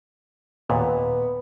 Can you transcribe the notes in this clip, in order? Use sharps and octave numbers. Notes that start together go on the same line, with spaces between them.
D#2 A#2 B3